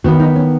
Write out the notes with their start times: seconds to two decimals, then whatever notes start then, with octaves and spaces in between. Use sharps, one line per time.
0.04 D#3 B3 F#4
0.19 D#4
0.36 C#4